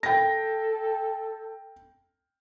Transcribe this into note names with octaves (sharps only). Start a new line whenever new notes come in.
A4 G5 A#6